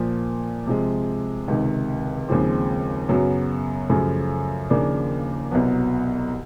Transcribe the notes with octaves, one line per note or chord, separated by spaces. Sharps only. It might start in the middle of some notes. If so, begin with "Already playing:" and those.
Already playing: A#2 F3 A#3
C3 F3 G#3
C#2 C3 D#3
D#2 C#3 F3 G#3 C4
F#2 C#3 F#3 B3
F#2 C#3 F3 A3
D#2 C#3 F3 A#3 D4
C2 B2 F#3 B3